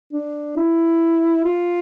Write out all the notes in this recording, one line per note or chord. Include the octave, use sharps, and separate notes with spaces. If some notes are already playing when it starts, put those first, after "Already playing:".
D4
E4
F4